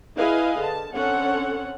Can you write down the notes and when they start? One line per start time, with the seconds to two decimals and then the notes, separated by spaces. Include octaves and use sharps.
0.17 E4 G#4 B4 D#5 F5 G#5
0.60 D3 A5
0.94 D3 C4 C#4 A4 C#5 F#5